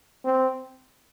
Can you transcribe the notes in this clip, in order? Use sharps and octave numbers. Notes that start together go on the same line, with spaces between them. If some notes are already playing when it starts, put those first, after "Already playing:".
C4